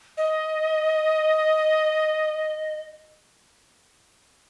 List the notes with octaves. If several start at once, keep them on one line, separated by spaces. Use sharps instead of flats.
D#5